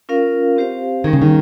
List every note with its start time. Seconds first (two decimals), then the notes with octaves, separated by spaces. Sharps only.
0.09 C#4 F4 A#4 F5
0.56 C4 G4 C5 F5
1.04 D#3 G3 A#3 C#4 G#4
1.13 C#3
1.22 D#3